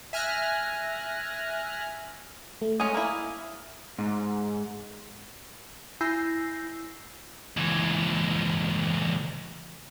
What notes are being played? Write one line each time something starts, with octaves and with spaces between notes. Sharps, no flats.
E5 G#5 F6 F#6 A#6
A3
G#3 C#4 D#6
A#3 E4
G#2
E4 G#5 E6 G6 A#6 C7
C#2 E3